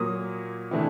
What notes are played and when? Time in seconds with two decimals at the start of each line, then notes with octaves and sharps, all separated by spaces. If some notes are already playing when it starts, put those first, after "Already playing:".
Already playing: A#2 F#3 A#3 D#6
0.71 C3 E3 A3 D4